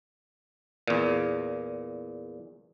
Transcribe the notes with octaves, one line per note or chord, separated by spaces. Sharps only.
E2 A#2